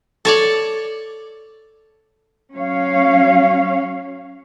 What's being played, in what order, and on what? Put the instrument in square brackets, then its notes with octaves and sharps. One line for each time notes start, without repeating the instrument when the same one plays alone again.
[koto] A4 C#5 D5
[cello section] F#3 C#4 C#5 F5